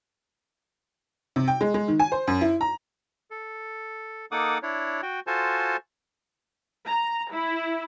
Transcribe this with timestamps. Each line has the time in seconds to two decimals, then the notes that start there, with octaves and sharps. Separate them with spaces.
1.36 C3
1.48 G5
1.61 G#3
1.74 G#3
1.88 D#3
2.00 G#5
2.12 C5
2.27 F#2
2.41 E4
2.61 A#5
3.31 A4
4.32 A#3 D#4 A4 F#5 D6 D#6
4.62 D4 E4 C#5
5.03 F#4 G5
5.27 F4 F#4 A4 C5 G#5 A5
6.87 A#5
7.31 E4